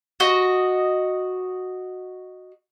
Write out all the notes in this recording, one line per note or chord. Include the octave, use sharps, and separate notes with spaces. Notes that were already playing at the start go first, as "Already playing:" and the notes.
F#4 D#5